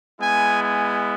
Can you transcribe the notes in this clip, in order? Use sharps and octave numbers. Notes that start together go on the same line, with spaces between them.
G#3 B3 E4 G#5
G#5